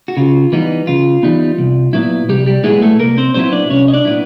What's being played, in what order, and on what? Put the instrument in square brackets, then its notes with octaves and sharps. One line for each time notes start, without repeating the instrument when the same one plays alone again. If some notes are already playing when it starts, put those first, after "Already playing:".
[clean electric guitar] F#4
C#3 F4
E3 G3 B3 D#4
C#3 F4
E3 G3 B3 D#4
C2
A#2 F#3 B3 E4
C2 G3 G4
G3 G4
A#2 F#3 G#3 B3 E4 G#4
A3 A4
C2 A#3 A#4
C4 C5
A#2 F#3 B3 C4 E4 C5
D4 D5
C2 C#4 C#5
D#5
D4 D5
A#2 F#3 B3 E4